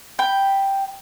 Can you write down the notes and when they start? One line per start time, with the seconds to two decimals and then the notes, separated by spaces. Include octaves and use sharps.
0.19 G5 B5